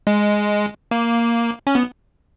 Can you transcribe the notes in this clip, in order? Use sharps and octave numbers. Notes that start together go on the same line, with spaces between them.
G#3
A#3
C#4
B3